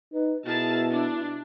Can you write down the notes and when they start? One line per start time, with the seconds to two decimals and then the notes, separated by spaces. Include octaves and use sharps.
0.13 D#4 B4
0.45 B2 E4 G#4 A#4 A5
0.91 D4